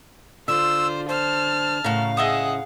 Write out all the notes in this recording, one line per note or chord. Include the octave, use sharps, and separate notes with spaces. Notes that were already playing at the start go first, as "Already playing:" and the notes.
D3 F4 C5 E6
C5 A5 F6
A2 C#3 F#4 A#4 F5
G#4 D#5 E5 F#5 D#6